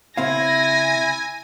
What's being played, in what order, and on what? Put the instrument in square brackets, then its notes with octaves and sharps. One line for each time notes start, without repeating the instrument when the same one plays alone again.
[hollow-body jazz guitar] C#3 C4 F5 [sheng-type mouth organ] E4 [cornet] G#5 [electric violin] A#6